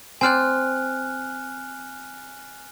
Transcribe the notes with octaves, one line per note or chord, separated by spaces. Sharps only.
C4 C5 D5 G#5 F6 F#6